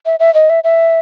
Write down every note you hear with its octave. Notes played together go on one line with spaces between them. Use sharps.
E5
E5
D#5
E5
E5